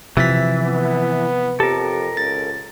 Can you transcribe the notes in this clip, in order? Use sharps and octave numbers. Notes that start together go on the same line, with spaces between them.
C3 E3 F3 E5 A6 B6
B3
F2 G4 A4 A#4
C#2 A6